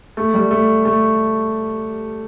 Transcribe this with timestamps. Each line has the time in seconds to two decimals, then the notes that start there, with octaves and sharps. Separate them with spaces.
0.17 A3
0.34 G3
0.51 A3
0.85 A3